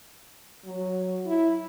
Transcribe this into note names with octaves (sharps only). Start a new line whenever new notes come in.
F#3
E4